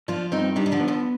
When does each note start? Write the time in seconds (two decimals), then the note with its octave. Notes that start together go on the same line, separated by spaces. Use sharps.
0.08 F3 D4 F4
0.32 G2 C4 D#4
0.56 D#3 G3 D4
0.66 D#3
0.72 D3 F3
0.80 B3
0.88 D3 F3